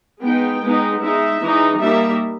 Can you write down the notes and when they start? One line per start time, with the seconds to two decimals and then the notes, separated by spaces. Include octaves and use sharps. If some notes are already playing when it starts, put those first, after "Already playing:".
0.22 G#3 B3 D#4 G5
0.62 G#3 B3 D#4
1.01 G#3 D#4 E5
1.41 E3 G#3 D#4
1.80 G3 A#3 D#4 E5